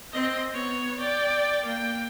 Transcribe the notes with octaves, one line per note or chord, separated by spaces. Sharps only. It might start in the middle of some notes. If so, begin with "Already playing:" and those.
C4 D#5
B3 C#5
D5 G5
A#3 G5